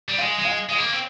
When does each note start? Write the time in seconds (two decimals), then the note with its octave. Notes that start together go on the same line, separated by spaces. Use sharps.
0.08 G3
0.18 G#3 F5
0.39 G#3
0.45 F5
0.69 G#3 F5
0.78 A#3
0.93 C4